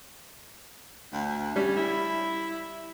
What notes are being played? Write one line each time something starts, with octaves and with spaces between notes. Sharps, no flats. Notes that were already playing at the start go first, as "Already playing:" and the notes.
D2
G3 C#4
E4